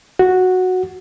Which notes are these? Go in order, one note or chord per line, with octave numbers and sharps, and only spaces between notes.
F#4